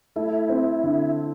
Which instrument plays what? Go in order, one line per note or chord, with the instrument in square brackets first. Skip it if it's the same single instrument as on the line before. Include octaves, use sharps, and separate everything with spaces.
[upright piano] A3 [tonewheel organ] E4
[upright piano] C4
D3